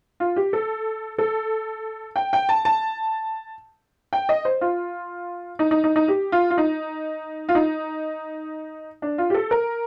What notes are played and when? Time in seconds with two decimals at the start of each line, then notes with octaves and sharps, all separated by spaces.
0.20 F4
0.36 G4
0.53 A4
1.18 A4
2.16 G5
2.33 G5
2.49 A5
2.65 A5
4.13 G5
4.29 D#5
4.45 C5
4.61 F4
5.59 D#4
5.71 D#4
5.84 D#4
5.96 D#4
6.08 G4
6.32 F4
6.50 F4
6.58 D#4
7.49 F4
7.55 D#4
9.02 D4
9.18 F4
9.30 G4
9.34 A4
9.51 A#4